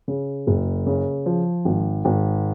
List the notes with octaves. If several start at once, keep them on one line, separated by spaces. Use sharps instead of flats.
C#3
F#1
C#3
F3
G#1
G#1